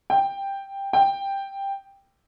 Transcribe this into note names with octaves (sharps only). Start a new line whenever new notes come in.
G5
G5